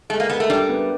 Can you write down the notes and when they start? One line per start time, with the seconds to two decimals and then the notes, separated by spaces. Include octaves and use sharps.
0.09 G#3 A3
0.20 A#3
0.29 B3 A#4
0.40 A3
0.49 G3 D4
0.69 B3